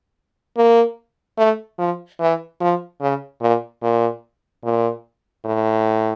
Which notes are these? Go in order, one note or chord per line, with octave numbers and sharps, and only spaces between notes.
A#3
A3
F3
E3
F3
C#3
A#2
A#2
A#2
A2